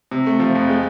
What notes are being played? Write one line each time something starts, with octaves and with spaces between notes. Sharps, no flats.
C3
A3
F3
F2
G#3